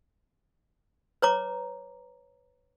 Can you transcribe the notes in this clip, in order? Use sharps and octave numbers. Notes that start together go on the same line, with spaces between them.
B4 C#5 A#5 D6